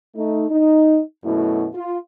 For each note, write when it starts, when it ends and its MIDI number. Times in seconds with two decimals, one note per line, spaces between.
0.16 0.44 57
0.16 0.44 63
0.50 1.00 63
1.24 1.67 42
1.24 1.67 47
1.24 1.67 57
1.24 1.67 64
1.73 1.97 65